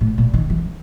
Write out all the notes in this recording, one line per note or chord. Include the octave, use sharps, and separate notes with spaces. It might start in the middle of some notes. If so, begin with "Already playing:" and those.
A2
A#2
D#3
E3